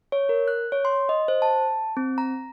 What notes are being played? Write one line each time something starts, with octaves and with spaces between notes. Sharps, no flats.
C#5
A#4
F#6
C#5
C6
D#5
C5
A5
C4
A#5